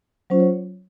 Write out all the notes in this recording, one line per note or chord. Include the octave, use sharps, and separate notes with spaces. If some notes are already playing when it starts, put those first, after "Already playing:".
F#3 C#4 F4 C5
C#5